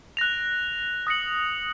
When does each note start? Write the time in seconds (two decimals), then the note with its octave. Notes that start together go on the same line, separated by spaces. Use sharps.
0.17 F#6 A#6 F7
1.07 D#6 F#6 A#6 C#7 F#7